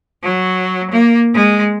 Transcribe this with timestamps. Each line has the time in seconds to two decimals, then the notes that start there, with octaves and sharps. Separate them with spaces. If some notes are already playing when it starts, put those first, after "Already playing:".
0.23 F#3
0.90 A#3
1.34 G#3